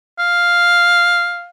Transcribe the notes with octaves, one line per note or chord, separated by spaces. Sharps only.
F5